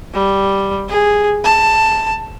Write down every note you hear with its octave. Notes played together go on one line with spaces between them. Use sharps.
G3
G#4
A5